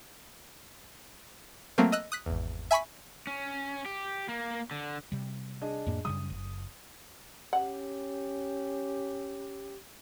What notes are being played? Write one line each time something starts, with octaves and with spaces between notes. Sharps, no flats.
F#3 A3 A#3 C4
D#5 E6 F#6
D#6 F#6 B6
G#1 E2
E5 G#5 B5 C#6 B6
C#4
G4
A#3
D3
C3 G3
D4 G#4 D#5
F2 A2 A#3
F#2 C#3 G3 D#6
F#1
C#4 G4 F#5